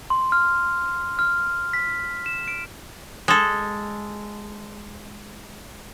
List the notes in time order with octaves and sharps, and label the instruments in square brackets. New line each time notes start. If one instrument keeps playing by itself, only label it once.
[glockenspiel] C6
F6
F6
B6
E7
D7
[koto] G#3 A4